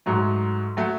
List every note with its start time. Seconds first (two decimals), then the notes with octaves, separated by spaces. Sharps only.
0.06 G#2 F#3 A3
0.77 F#3 A3